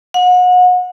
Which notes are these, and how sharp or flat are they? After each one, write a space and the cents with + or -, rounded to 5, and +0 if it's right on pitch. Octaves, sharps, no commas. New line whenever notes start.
F#5 -35